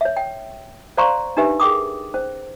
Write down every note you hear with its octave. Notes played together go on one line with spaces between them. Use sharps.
C#5 E5
G5
C5 D5 F5 A#5 C6 C#6
D4 D#4 G4 B4 E5
G#4 A#4 G5 D6 D#6
C#4 C5